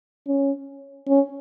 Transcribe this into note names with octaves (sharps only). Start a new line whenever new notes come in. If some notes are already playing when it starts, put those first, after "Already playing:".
C#4
C#4